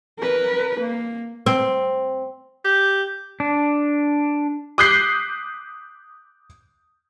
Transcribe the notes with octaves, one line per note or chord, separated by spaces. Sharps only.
A#4 B4
A#3
C4
G4
D4
D6 D#6 F#6 G6 B6 C7